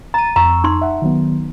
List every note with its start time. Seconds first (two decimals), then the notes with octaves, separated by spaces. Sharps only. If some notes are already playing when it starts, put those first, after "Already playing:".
0.14 A#5 A6 D#7
0.36 F2 A#5 C#6 E6
0.64 D#4 C6
0.81 E5 F#5
1.02 D#3 F#3 B3